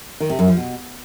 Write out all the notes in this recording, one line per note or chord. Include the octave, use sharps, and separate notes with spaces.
D#3
C3
F#2
F3
B2